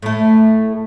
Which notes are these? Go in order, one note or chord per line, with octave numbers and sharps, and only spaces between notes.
A2 A3